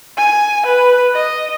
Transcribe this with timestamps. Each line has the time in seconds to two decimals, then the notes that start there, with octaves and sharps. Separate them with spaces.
0.17 G#5
0.66 B4
1.13 D#5